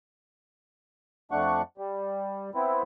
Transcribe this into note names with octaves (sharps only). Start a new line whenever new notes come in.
F2 A3 D4 F#5 C#6
G3
B3 C4 E4